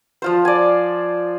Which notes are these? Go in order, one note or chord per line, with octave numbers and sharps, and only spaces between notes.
F3 F4 C5
D5 G#5